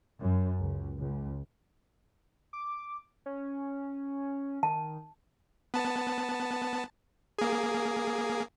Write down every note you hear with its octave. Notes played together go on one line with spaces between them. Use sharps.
F#2
C#2
C#2
D6
C#4
D#3 A5
B3 A5
A#3 G#4